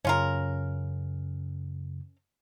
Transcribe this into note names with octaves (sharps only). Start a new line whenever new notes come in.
F#2 C#3 C#4 F4 A#4